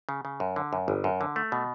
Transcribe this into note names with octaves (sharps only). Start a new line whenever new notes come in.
C#3
C#3
F#2
D3
F#2
G1
F#2
D3
A3
B2